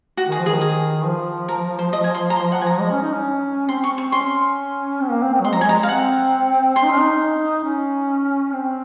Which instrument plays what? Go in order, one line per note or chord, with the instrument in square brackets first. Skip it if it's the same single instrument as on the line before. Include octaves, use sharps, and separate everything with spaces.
[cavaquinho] F#4
[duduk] D#3 [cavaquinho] G#4
[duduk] F3
[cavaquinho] G#4
[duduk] D#3
[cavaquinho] G#4
[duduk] F3
[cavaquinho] A#4
C5
D#5
G#5
C6
A#5
C6
F#5
G#5
A#5
[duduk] G#3
C#4
D#4
C#4
[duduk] C4 [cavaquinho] C6
[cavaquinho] C#6
[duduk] C4
[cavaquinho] C#6
[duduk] C#4 [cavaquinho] C6
[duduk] C4
A#3
C4
C4
F#3
[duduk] G#3 [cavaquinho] C6
[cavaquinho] A#5
[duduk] F3
[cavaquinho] G#5
[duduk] G#3 [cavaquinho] A#5
[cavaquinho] F5
[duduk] C4 [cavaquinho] F#5
[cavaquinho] C6
[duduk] D#4
C#4
D#4
C#4
C4